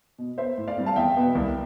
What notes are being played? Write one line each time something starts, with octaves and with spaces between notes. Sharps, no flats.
B2
B3 C5 E5
A2
D5 F5
G3 C4
F5 A5
E2 E5 G5
B2 B3
C2